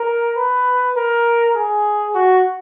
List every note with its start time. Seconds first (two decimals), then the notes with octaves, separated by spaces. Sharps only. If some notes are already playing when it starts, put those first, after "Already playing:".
Already playing: A#4
0.37 B4
0.96 A#4
1.55 G#4
2.15 F#4